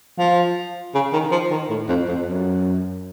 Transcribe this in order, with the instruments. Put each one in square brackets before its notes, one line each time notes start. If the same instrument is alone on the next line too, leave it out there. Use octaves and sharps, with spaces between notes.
[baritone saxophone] F3
C#3
D#3
F3
D#3
A2
F2
F2
F#2